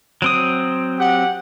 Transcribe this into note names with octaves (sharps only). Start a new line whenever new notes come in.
F#3 C4 D#6
G4 F#5